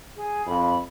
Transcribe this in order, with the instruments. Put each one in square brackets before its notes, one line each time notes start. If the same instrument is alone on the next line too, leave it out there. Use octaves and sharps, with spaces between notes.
[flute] G#4
[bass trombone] F2 [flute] B5